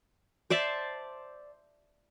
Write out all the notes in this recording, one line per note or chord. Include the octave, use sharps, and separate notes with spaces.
C5 D5 E5 A5